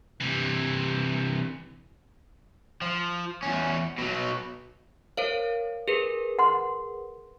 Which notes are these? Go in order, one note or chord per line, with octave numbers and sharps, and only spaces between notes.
C3 E3
F3
E2 C#4
B2 F#3
A#4 C5 C#5 F5
G#4 A#4 B4
F#5 C6